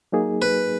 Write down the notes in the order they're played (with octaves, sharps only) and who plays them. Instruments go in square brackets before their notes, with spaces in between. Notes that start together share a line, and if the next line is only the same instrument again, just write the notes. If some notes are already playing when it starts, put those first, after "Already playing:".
[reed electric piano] F#3 A#3 D#4 G#4
[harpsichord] B4